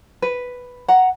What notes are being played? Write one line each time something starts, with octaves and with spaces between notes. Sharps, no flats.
B4
F#5 A#5